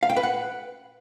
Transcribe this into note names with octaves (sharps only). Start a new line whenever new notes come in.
F5
G5
B4
F#5